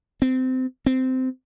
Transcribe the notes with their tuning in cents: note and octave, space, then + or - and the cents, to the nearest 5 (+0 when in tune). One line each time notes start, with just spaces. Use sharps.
C4 -25
C4 -15